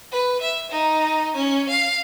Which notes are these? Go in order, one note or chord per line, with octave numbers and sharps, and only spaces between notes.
B4
E5
D#4
C#4
F5